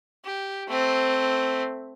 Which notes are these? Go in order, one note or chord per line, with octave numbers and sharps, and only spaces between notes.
G4
A3 C4